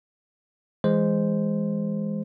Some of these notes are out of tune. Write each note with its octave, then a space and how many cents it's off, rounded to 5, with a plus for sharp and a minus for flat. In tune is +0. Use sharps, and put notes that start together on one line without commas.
E3 +0 G#3 -10 C5 -5